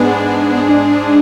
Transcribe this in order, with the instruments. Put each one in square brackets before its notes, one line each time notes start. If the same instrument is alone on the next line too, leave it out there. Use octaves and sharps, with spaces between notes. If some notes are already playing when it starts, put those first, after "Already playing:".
Already playing: [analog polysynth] G#2 G#3 D4 G#4 [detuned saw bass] B3
[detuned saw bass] D4